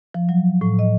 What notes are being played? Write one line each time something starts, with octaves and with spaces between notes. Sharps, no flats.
F3
F#3
A2
D#5